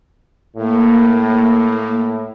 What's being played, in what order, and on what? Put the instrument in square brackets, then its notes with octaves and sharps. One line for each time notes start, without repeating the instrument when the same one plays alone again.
[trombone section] A2 [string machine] A#3